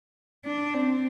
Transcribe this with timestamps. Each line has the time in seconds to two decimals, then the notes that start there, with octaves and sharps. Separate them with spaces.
0.45 D4
0.74 C4